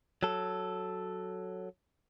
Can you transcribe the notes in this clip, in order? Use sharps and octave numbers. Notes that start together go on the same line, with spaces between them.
F#3 A4